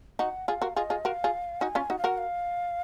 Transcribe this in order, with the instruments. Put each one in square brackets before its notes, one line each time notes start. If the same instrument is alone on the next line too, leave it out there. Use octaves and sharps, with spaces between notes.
[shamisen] D#4 F#4 [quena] F#5
[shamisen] F4 G#4 [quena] F#5
[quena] F5
[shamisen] F#4 A#4
[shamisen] F4 G#4 [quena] D#5
[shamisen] F4 G#4
[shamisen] F#4 A#4 [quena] F5
[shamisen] F4 G#4
[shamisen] D#4 F#4 [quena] G#5
[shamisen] C#4 F4
[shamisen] D#4 F#4 [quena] F#5
[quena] F5
[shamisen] F#4 A#4 [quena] F#5
[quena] F5